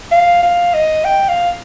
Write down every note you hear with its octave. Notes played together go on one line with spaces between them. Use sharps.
F5
F5
D#5
G5
F5